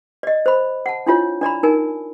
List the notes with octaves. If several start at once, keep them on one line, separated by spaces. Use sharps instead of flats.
D5 D#5
C5 B5
F#5 A5
D4 E4 F4 C#5
D4 D5 A#5 B5
D#4 A#4 G#5